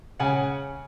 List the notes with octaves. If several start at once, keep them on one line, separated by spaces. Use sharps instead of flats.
C#3 F#5 G#5